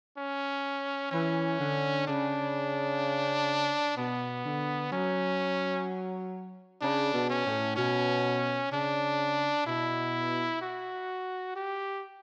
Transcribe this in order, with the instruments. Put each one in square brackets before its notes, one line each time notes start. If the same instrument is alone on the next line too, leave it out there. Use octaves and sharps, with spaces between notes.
[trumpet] C#4
[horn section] E3 [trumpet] C#4
[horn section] D3
[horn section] C#3 [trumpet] D4
[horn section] B2 [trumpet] B3
[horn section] D3
[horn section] F#3 [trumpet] C#4
[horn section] C#3 [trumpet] D4
[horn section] B2
[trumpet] C#4
[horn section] A2
[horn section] B2 [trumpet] C#4
[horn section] C#3 [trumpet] D4
[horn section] B2 [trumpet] E4
[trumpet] F#4
G4